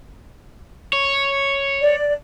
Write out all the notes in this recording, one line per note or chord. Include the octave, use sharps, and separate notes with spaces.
C#5
D5